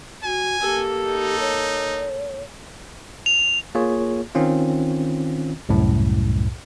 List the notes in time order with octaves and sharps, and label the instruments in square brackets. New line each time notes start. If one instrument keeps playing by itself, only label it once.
[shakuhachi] F#4 [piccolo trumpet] G#5
[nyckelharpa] A#3 A4 [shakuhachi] G4
[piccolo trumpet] D#4
[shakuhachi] C#5
[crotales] F7
[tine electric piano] A#3 F4 G#4 C#5
D#3 C4 C#4 F4
C2 F#2 A2